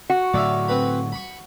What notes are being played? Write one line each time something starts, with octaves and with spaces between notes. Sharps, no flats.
F#4
A2 D3 F#3 D5 E5 F5
C4 B4 B5
B5 C#6